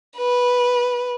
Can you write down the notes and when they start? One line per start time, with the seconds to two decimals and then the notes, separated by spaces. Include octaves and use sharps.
0.17 B4